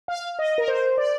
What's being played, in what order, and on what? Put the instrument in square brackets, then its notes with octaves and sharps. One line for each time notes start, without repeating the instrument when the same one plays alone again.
[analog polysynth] F5
D#5
A#4
C5
D5